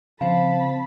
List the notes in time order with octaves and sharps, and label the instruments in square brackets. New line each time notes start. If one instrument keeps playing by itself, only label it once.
[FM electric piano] C#3 F3 [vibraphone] C4 C5 [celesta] F5 [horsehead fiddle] A5 B5